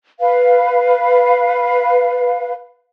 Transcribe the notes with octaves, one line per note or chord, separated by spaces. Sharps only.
B4 F5